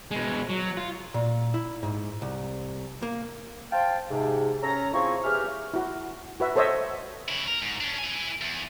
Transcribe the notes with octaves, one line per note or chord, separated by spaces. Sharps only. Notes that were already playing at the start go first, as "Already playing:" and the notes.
B2 G#3
F#3
F4
A#2
E4
G#2
C2
A#3
C5 F5 G5 A5
G#2 C3
C#4 A4 A#5
C4 E4 F4 G#4 C#6
E2 G4 G#4 C#5 E5 F6
E4 F#4
F#4 B4 E5
A4 C5 C#5 D#5 E5
C#3 E4
A#4
G#2
C#4 D4
E4 G#5
E2